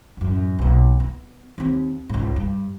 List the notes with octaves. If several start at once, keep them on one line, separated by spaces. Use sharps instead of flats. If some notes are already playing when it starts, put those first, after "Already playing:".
A1 F#2
B1 A#3
B3
D#2 C4
C#2 G#2
G2